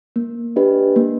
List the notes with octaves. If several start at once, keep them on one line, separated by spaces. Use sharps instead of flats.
A#3
D4 G4 B4 D#5
A#3